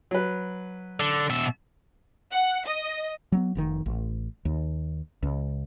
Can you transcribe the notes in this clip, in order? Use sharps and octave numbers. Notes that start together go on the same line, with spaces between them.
F#3 B4
D3
B2 E5
F#5
D#5
F#3 A#3 B3
F1 A#2 D#3
A1
D#2
C#2